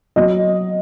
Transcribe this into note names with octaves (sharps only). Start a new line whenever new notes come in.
F#3 D#5